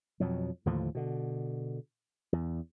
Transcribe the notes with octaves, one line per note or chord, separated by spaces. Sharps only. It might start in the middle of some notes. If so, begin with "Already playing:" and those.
F2 B2 F#3
D#2 A2 D3 F3
B2 D3
E2